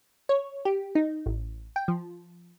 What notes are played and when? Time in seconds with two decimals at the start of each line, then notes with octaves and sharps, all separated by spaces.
0.29 C#5
0.65 G4
0.95 D#4
1.26 A1
1.76 G5
1.88 F3